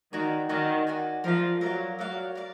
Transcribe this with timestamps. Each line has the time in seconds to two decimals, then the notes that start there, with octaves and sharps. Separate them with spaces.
0.13 D#3 F#4 D5 G#5
0.49 D#3 F#4 D5 G#5
0.87 F#4 D5 G#5
1.24 F3 A#4 D5 F5
1.61 F#3 A#4 D5 F5
1.99 F#3 A#4 D5 F5
2.35 A#4 D5 F5